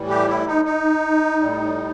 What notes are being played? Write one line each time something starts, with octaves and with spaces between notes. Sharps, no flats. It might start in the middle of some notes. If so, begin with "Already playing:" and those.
Already playing: A2 E3 G3
G4
E4
D#4
D#4
A2 G3